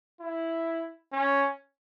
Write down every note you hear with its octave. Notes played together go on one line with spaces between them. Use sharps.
E4
C#4